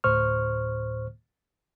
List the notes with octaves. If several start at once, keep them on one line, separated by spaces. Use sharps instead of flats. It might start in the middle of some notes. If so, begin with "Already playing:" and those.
D2 A2 C5 C#6 F6